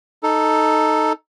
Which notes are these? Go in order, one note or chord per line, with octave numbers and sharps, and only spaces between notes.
D#4 A4